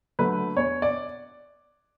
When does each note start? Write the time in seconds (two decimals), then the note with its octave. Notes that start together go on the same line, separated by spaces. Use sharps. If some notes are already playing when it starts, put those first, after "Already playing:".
0.19 D3 F#3 A3 B4
0.56 E2 C#5
0.82 D5